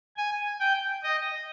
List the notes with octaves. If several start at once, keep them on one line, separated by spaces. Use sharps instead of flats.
G#5
G5
D#5